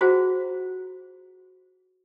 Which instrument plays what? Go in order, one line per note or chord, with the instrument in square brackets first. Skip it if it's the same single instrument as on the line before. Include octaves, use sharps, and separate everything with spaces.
[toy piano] F4 F#4 G#4 C5 F#5 A#5